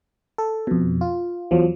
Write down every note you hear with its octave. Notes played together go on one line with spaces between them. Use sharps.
A4
F2 B2
F4
E2 F3 F#3